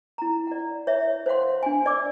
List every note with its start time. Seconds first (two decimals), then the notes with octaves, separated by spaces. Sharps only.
0.18 E4 A#5
0.47 D5 F#5
0.87 C#5 E5
1.26 C5 C#5 F5 F#5 C6
1.63 D4 G#5
1.86 D5 D6 E6